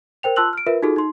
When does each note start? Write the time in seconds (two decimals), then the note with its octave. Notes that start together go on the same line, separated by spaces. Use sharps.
0.23 A#4 C5 G5 F7
0.36 F4 A5 C6 E6 F#6 F#7
0.53 F6 D7
0.66 F4 A#4 B4 E5
0.83 D#4 F4 F#4 G#4 A4
0.96 D#4 C6